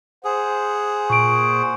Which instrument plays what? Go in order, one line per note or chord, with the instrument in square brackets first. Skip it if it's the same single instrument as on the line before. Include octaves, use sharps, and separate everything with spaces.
[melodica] G#4 [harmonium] C5 F#5
[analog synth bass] A#2 [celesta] C#6 D7